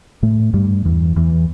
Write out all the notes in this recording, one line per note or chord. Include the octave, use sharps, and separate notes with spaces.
A2 A3
G2 G3
E2 E3
E2 E3